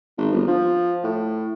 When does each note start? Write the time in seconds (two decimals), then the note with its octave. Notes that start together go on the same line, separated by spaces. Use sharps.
0.18 G#1
0.32 G1
0.47 F3
1.03 A2